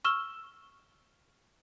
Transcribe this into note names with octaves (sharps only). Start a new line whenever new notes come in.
C#6 E6 F6 E7 G7